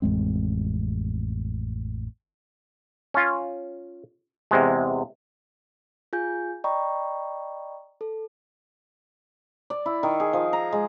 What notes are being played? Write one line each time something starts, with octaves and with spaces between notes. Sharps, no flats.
A1 F2 G#3 C4
C#4 F4
E2 C3 G#3
F4 G#4 G#5 G6
D5 D#5 G5 A#5 B5 C#6
A4
D5
E4
D#3
G#4
F3
A#5
G#3